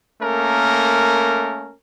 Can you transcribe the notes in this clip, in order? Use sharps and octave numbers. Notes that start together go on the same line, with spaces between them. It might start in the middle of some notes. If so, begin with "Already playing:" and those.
A3 A#3 C#4 A#4